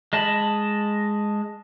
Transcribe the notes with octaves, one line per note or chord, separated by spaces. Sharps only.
G#3 D#5 A5 B5